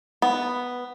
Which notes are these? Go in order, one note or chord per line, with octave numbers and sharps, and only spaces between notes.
B3